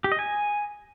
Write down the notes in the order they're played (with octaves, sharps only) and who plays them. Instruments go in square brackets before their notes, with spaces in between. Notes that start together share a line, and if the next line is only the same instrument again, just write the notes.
[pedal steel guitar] G4
D#5
G#5